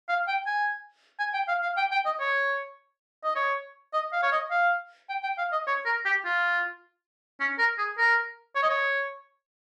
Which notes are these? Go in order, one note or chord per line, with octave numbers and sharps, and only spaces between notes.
F5
G5
G#5
G#5
G5
F5
F5
G5
G5
D#5
C#5
D#5
C#5
D#5
F5
C#5
D#5
F5
G5
G5
F5
D#5
C#5
A#4
G4
F4
C#4
A#4
G#4
A#4
C#5
D#5
C#5